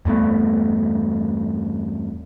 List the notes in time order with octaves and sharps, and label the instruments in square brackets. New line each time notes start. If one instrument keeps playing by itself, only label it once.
[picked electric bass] E2 G2 A3 B3